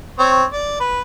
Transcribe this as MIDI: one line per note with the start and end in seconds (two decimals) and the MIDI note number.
0.19 0.44 60
0.19 0.44 73
0.53 0.77 74
0.80 1.01 71